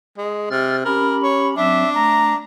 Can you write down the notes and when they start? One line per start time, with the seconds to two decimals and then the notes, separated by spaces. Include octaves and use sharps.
0.17 G#3
0.51 C3 F6 A6
0.85 C#4 G4 A#4 B5
1.23 C#5
1.57 F#3 C4 D4 E5
1.95 A3 A#5